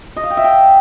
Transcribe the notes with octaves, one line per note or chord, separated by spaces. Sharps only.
D#5
F5
G5
E5
G5